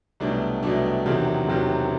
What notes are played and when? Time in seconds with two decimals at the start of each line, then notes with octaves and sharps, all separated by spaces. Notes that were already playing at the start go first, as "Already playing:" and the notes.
0.20 C2 B2 F#3 A3 D4
0.63 C2 B2 F#3 A3 D4
1.05 E1 E2 C3 D#3 F#3
1.47 E1 E2 C3 D#3 F#3